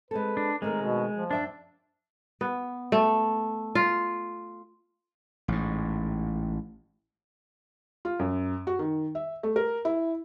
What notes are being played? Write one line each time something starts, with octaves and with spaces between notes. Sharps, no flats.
G#3 C4 A4 B4
D4
D#3 G#3 A3 C4 A#4
B2
F3
F#2 D4 E5 G5
B3
A3
F4
A1 G#2
F4
F#2
F#4
D#3
E5
A3
A#4
E4